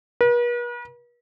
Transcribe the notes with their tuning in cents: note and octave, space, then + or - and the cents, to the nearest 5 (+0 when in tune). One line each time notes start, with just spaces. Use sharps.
B4 -45